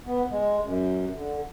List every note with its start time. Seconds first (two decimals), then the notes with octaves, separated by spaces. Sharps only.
0.06 B3
0.31 G#3
0.63 F#2
1.15 D3